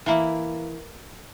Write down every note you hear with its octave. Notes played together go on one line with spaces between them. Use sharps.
E3 A#3 E4